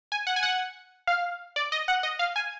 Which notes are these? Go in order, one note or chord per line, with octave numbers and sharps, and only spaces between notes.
G#5
F#5
G#5
F#5
F5
D5
D#5
F#5
D#5
F5
G#5